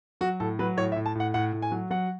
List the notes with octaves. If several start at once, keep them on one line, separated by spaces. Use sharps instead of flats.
F#3 F#4
A2 A4
F#3 B4
A2 C#5
E5
A2
A5
A2 F#5
A2 F#5
A2
G#5
F#3
F#3 F#5